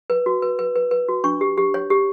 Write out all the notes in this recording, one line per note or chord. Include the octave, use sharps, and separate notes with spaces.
B4
F#4
B4
B4
B4
B4
F#4
D4 C#6
G4
G4
C#5
G4